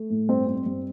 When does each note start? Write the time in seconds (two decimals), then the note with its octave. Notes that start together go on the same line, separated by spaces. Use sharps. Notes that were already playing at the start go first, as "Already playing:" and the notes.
Already playing: A3
0.10 A2
0.29 G2 C4 C5
0.47 C4
0.66 G2